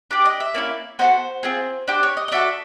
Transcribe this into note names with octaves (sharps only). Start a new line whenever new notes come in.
D4 G4 D5
D#5
E5
A#3 C#4 E4 D5
B3 D#4 F#4 A4 C5
C4 F4 G#4
D4 G4 C5
C#5
D#5
D#5
D4 F#4 A4 E5